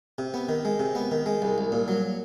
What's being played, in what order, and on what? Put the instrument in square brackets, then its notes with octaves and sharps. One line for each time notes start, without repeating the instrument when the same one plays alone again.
[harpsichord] C3
B3
D#3
G#3
C3
B3
D#3
G#3
C2
C2
A#2
F#3